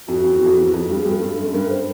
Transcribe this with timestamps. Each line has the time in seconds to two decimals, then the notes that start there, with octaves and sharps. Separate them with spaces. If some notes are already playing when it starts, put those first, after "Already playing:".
0.08 F2 F#4
0.24 F2
0.36 E2
0.46 F2
0.58 E2
0.74 F2
0.80 F#4
0.90 G2 G4
1.00 G#4
1.06 G2
1.11 A4
1.22 G2 A4
1.38 F#2
1.47 A4
1.54 G2 A#4
1.71 C5